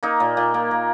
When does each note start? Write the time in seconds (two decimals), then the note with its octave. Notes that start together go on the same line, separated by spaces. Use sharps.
0.03 A#3 D#4
0.20 A#2
0.37 A#2
0.54 A#3
0.71 A#3